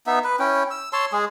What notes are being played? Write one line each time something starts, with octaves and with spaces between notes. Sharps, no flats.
B3 D#4 E5
B4
C#4 E4 G5
E6
C#5 A5 C6 E6
G#3 G#4